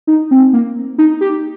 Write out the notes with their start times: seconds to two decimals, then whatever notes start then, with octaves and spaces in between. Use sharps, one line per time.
0.07 D#4
0.31 C4
0.53 A#3
0.98 D#4
1.21 G4